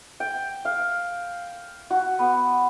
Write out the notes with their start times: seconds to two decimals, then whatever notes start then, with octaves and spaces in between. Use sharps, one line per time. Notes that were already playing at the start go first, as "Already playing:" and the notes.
0.20 G5
0.65 F5
1.90 F#4
2.19 B3